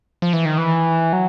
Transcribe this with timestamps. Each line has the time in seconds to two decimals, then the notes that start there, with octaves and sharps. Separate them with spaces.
0.22 F3
0.33 E3
0.45 D#3
0.58 E3
1.13 F#3